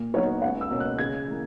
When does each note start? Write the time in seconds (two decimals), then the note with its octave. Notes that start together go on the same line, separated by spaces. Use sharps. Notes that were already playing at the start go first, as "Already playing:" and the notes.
Already playing: A#2
0.14 F#3 B3 D#4 F#4 C#5
0.42 C#2 F#5
0.61 E6
0.70 B2 A#3 C#4 F#4
0.80 F#6
0.98 C#3 G#6
1.27 E3 A#3